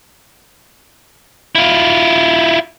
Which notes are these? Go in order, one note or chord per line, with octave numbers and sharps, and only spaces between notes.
E4 F4